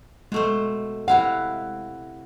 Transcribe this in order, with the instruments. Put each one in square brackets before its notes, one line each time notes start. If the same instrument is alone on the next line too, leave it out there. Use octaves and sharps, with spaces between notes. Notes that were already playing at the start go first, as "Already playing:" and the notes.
[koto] B2 A3 C5 [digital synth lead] G#3
[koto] C3 E4 F5 [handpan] F#5